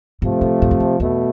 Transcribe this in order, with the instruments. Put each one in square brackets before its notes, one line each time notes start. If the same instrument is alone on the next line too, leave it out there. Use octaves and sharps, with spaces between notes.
[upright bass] G#2 [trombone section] C3 F3 A3
[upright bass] A2
G#2
F2
E2
[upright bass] E2 [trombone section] B2 A3